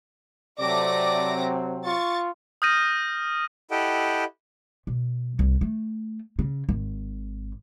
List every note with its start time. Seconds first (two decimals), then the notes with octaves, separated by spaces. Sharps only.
0.59 C3 F#3 A3 C4 D5 D6 A#6
1.85 F4 C#6 A6
2.62 D#6 F6 G6 A#6 D#7
3.71 E4 G4 A4 D#5 F#5 G5
4.87 B2
5.39 C2
5.61 A3
6.39 C#3
6.69 G#1